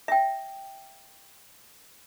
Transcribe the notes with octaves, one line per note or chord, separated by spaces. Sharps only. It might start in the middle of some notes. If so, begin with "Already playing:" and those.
E5 G5